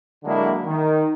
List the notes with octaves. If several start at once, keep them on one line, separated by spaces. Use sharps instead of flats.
D3 F#3 G#3 A#3 E4
D#3